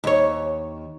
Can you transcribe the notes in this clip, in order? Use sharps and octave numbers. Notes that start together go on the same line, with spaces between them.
D#2 C#5